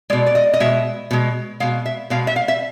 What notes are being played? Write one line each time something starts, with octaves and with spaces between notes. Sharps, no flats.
B2 G#3 D5
D5
D#5
D#5
B2 G#3 E5
B2 G#3
B2 G#3 F5
E5
B2 G#3 F5
E5
F5
E5